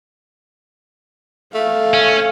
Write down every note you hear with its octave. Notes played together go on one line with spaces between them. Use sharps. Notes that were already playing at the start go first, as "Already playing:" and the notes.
A3 F5
C#4